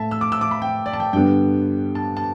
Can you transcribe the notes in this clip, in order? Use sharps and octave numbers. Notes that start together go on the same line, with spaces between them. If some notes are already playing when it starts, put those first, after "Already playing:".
Already playing: A2 A3 E5 A5
E6
D6
E6
D6
B5
G5
D5
A5
G5
G2 D3 G3 B3 G5
A5
A5